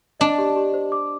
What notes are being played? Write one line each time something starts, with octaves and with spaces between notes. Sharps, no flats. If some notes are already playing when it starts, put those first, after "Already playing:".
D4 D#5
G4
G4
C5
D6